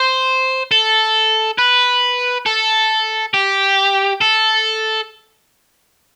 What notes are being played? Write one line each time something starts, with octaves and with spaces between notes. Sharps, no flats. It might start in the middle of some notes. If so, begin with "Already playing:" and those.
Already playing: C5
A4
B4
A4
G4
A4